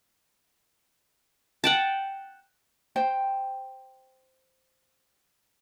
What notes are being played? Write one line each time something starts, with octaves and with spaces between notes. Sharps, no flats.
F#5 G5 A5
C5 G5